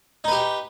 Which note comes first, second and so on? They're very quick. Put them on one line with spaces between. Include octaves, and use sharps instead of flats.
D#4 B4 G4